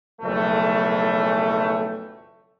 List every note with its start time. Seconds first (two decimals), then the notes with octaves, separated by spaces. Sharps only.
0.21 F#1 B1 F2 E3 A3